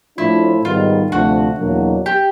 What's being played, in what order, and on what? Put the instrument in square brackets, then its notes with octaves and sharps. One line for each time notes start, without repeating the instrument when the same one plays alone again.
[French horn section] A2 F3 A3 D4 F4 [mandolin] E4
[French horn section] G#2 D#3 G3 B3 D#4 [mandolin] F4
[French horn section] D2 C3 F3 A3 D4 [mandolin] F#4
[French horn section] E2 B2 F#3 A#3 D4
[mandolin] G4